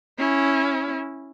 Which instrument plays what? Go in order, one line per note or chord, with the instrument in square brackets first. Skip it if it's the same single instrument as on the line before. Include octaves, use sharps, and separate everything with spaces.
[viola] C#4 E4